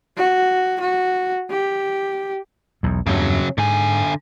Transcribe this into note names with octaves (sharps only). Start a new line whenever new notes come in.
F#4
F#4
G4
B1 E2
E2 G2 C#3 F#3
G#2 D3 G#5